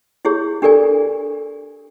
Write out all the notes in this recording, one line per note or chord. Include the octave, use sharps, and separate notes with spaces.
E4 G4 G#4 C#5
D4 G4 A4 A#4 D5 G#5